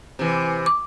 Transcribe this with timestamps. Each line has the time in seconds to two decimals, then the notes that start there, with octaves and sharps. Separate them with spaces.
0.19 C3 E3
0.66 D6